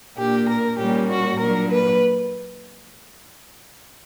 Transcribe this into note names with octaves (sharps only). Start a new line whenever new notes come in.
A#2 A#3 D4 G4
A#4
A#2 G3 A#3 C#4 G4
F#4
A#2 F#3 A#3 D4 A#4
B4